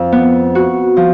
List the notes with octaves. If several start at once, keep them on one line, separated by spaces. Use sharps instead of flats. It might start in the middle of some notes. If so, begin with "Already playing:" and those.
Already playing: F2
B3
F#4
F3